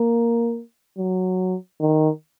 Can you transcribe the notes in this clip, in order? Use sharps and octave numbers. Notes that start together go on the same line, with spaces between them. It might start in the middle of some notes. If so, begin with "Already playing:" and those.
Already playing: A#3
F#3
D#3